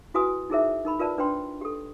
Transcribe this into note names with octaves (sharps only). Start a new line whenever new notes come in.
E4 F#4 B4 G#5 D#6
D#4 E4 G#4 A#4 C5 E5
D#4 A#4 B5
F4 A#4 B4 D5 A5
D4 B4 C5 G5 C6
G4 A4